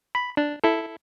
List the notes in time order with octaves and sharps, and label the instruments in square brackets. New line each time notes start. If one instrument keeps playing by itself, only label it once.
[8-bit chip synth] B5
D4
E4 A4